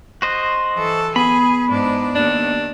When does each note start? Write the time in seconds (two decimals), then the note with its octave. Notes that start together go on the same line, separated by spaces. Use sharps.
0.22 F#4 C5 D#5
0.74 E3 A4
1.16 B3 G#4 B5
1.69 G#2 D4
2.15 D#2 D4